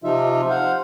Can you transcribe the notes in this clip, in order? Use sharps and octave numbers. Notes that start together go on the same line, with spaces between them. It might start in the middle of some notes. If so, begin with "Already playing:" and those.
C3 F3 D#4 F4 E5
C5 F5 F#5